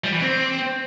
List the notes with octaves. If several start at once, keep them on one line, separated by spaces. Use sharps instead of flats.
G3
E3
C4